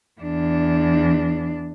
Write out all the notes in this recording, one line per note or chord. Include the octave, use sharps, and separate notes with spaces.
E2 D4